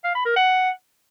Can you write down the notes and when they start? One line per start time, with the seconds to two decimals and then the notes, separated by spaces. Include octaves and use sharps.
0.04 F5
0.15 B5
0.26 A#4
0.36 F#5